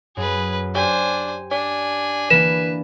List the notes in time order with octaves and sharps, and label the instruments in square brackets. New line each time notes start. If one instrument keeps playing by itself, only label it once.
[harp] F#2 [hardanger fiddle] G#4 B4
[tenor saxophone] D4 [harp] G4 [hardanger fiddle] C5 G#5
[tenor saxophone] D4 [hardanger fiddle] G#5
[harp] E3 A#3 D4 [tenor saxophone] B4 [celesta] E7